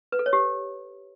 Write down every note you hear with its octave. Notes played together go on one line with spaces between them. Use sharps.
B4
A4
C#5
G4